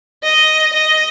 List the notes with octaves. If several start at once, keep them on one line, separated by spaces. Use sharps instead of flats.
D#5
D#5